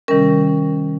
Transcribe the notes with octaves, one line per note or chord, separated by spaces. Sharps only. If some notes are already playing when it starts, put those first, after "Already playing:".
C3 D#3 G3 C#4 A#4